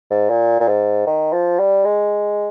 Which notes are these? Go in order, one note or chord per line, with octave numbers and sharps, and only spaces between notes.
G#2
A#2
A#2
G#2
D#3
F3
G3
G#3